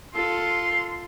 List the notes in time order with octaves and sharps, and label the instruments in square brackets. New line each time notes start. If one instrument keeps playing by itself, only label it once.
[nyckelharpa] F4 A4 [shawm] C6